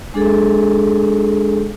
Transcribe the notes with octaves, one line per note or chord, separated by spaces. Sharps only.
G#3 D4 G#4 A4